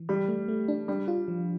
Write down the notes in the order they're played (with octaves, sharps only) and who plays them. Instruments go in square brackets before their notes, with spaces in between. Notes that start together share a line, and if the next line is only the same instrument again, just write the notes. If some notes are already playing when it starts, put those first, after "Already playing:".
Already playing: [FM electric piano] E3
[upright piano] G3 [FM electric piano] G4
[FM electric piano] A3
A3
D4
[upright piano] G3 [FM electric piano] D4
[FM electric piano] F4
F3